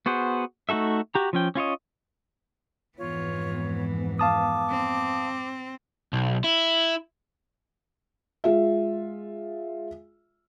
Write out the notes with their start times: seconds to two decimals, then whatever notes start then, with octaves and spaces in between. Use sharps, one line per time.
0.06 B3 F#4 G#4 C5
0.69 A3 D#4 F#4 A4 E5
1.15 F#4 G4 A#5
1.33 F3 C#4 G5
1.55 C#4 F4 C#5 D#5
2.98 F2 G#2 E3 B3 F4 C#5
4.19 F5 A5 D6 D#6
4.69 C4
6.13 B1
6.44 E4
8.44 G#3 F4 E5